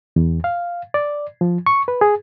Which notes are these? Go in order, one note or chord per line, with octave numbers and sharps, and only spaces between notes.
E2
F5
D5
F3
C#6
B4
G#4